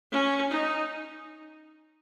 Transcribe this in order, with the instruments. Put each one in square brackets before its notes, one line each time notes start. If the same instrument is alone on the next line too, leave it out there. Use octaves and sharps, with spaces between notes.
[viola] C#4
D#4